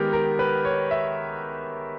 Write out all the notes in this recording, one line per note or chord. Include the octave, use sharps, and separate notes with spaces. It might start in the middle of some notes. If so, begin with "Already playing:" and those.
Already playing: D#3 G#3 B3 G4 A#4
A#4
B4
C#5
E5